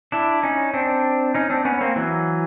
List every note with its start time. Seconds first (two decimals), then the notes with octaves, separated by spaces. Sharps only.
0.12 D4 E4
0.43 C#4 D#4
0.74 C4 D4
1.34 C#4 D#4
1.50 C4 D4
1.65 B3 C#4
1.81 A#3 C4
1.96 E3 F#3